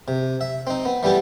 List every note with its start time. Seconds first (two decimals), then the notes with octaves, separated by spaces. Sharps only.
0.08 C3
0.41 E5
0.67 C4 D#4
0.85 B3
1.03 E3 G3 B3 G4 A4